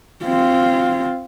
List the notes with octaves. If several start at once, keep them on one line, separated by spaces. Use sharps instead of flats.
C4 F4